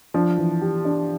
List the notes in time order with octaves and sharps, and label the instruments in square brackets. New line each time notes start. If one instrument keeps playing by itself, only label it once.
[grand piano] F3 [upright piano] D4
[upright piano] E3
G4
D4